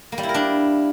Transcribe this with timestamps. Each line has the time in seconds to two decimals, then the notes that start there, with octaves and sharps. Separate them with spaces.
0.12 A#3
0.18 G3
0.23 E4
0.29 A#4
0.34 D4